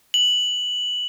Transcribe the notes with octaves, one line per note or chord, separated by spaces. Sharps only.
F#7